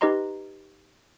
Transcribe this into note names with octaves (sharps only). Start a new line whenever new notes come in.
D#4 G4 B4 D#5 A#5 C6